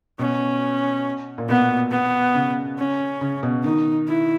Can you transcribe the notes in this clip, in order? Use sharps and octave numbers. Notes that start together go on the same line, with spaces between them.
B2 C#4
A#2
B2 B3
B3
C#3
C#4
C#3
B2
D#3 D#4
E4